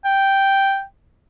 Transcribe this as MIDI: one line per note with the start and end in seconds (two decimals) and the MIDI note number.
0.05 0.83 79